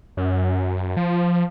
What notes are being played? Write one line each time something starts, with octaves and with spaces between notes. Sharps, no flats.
F#2
F3